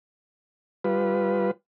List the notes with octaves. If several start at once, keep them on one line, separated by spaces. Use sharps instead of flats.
G3 F4 B4